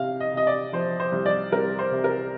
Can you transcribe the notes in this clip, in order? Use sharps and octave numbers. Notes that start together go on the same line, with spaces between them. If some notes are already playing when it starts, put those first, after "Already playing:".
Already playing: C3 F5
D#5
C3 D#5
D5
F3 C5
C5
C2
D5
C2 A#4
C5
C3
A#4